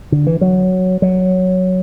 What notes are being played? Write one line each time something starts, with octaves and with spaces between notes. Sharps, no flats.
D3
E3
F#3
F#3